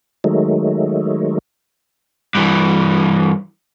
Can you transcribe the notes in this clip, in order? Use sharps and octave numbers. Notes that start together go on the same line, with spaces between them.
D#3 F#3 G#3 A3
G2 E3